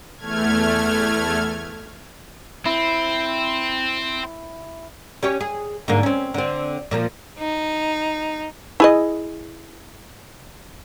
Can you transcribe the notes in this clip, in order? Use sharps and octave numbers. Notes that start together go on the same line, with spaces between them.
E2 A3 F6 G#6
C4 E4
C#4 G4 C#5
G#4
G#2 D3 A#3
C4 C#4
D3 C4
A#2 F3 A#3
D#4
E4 G#4 D#5